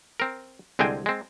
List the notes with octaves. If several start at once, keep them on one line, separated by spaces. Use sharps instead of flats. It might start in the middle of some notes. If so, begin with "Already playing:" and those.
C4 A#4
C2 D3 G#3 C4 G5 G#5
G#3 C4